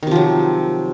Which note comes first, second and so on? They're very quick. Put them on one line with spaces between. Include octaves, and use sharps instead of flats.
D#3 C3 F3 F#3